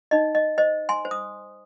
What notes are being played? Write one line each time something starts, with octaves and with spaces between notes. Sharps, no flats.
D#4 D#5
D#5
C5 D#5
G#5 C6
C5
D#6